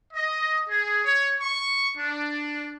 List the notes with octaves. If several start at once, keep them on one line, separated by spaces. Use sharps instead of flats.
D#5
G#4
C#5
C#6
D4